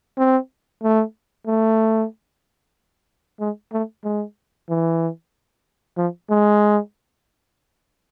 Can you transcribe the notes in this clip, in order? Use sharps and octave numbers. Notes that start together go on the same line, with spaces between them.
C4
A3
A3
G#3
A3
G#3
E3
F3
G#3